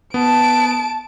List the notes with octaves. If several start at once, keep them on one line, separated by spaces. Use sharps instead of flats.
B3 A5 D7